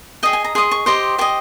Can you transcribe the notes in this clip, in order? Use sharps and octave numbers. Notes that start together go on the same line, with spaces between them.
G#4 D#5 G5
G#5
A#5
G#4 D#5 C6
C#6
G4 C5 D#5 C6
G4 C5 D#5 G#5